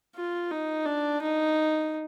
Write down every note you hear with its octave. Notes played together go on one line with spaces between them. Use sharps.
F4
D#4
D4
D#4